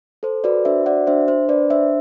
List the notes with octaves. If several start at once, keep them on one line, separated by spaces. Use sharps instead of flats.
A4 C5
F#4 B4 D5
D4 C5 E5
F#4 D5 F#5
D4 C5 E5
D4 C5
D4 B4 D5
D4 C5 E5